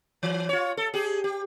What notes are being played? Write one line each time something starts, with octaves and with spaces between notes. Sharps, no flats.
E3
F4 C#5
A4
G4 G#4
G4